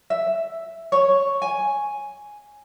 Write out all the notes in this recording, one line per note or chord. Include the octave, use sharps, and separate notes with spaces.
E5
C#5
G#5